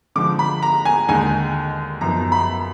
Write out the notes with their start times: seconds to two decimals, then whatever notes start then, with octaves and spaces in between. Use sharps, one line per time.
0.16 D3 F3 G#3 D#4 D6
0.39 B5
0.62 A#5
0.85 G#5
1.08 D#2 D3 G#3 D#4 G#5
2.01 F#2 F3 B3 D#4 A#5
2.32 B5